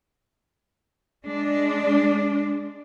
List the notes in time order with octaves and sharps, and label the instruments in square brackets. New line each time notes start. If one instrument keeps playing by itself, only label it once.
[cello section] G#3 D4